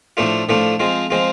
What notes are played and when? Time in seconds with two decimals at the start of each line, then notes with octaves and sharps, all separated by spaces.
0.17 A2 F3 A3 D4 F4
0.49 A2 F3 A3 D4 F4
0.80 F3 G#3 C4 F4
1.10 F3 G#3 C4 F4